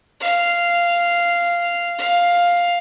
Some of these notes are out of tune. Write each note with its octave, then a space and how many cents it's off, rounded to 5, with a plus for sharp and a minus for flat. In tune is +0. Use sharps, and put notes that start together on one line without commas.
F5 -10
F5 +5